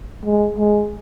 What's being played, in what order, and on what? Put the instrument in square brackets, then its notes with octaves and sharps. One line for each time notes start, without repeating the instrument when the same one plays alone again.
[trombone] G#3
G#3